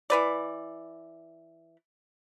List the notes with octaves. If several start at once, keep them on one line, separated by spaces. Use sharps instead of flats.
E3 B4 D5